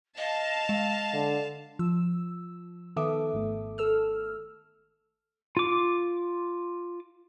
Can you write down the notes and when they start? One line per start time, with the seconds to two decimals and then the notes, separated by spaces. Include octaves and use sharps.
0.17 D#5 F5 A5
0.69 G#3
1.13 D3
1.79 F3 E6
2.96 D#3 B3 A4 E5 D6 D#6
3.33 G#1 A3
3.78 A4 E6 F6
5.57 F4 D6